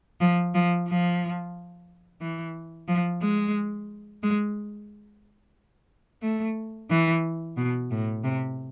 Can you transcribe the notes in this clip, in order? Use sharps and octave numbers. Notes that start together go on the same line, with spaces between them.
F3
F3
F3
E3
F3
G#3
G#3
A3
E3
B2
A2
C3